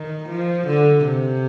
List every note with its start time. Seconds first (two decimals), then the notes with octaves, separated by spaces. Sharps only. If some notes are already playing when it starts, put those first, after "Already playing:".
Already playing: D#3
0.29 F3
0.67 D3
1.05 C3